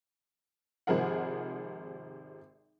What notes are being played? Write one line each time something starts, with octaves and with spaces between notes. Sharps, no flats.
G#1 C3 F3 G#4 A#4 F#5